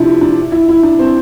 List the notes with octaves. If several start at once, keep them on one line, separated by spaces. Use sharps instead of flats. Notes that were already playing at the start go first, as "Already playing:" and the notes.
Already playing: C3 F3 D4 E4
D4
E4
E4
D4
C4